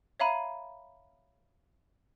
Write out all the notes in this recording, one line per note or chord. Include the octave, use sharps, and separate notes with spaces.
C#5 E5 F5 A#5 B5 D#7